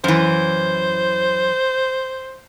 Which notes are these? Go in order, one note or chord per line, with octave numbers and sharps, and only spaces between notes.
F#2 E3 C5